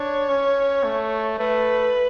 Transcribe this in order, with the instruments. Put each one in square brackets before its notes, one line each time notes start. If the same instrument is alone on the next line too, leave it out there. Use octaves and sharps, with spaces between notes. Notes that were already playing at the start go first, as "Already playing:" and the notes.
Already playing: [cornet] D4 [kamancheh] C#5
[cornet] C#4
A3
[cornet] A3 [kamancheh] B4